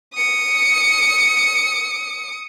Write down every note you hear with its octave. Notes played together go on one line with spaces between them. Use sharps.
D#6 C#7